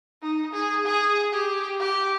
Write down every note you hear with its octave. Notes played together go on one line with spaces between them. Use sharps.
D#4
G#4
G#4
G4
G4